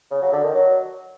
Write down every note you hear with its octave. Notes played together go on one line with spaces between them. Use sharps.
C#3
F#3
D3
D#3
F#3